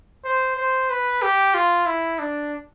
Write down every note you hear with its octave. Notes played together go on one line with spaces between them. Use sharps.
C5
C5
B4
G4
F4
E4
D4